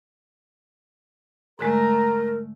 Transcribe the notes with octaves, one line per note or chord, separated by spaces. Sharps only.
G#2 D3 G#3 A3 A#4 A#5